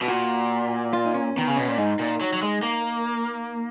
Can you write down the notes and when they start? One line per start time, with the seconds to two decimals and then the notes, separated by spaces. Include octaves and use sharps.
0.01 B2
0.08 A#2 F#4
0.93 F4
1.06 D#4
1.14 C#4
1.36 D#3 B3
1.47 C#3
1.57 B2 C#4
1.68 A#2
1.77 G#2 D#4
1.99 A#2
2.21 F#3
2.33 F#3
2.42 G#3
2.63 A#3